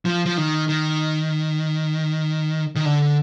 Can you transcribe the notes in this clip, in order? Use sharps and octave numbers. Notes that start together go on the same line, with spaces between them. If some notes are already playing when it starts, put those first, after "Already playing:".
F3
F3
D#3
D#3
D#3
D3